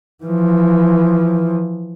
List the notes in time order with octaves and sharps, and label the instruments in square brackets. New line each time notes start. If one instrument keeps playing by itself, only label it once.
[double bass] E3 F3